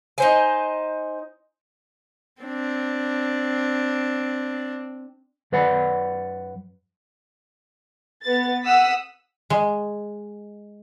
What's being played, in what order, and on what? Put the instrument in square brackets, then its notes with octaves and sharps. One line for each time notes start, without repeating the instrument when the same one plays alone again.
[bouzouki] D#4 C5 G#5
[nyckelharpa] C4 D4
[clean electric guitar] F#2 B4 D5 F#5 B5
[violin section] B3 A6
F#5 D#6 E6 B6
[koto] G#3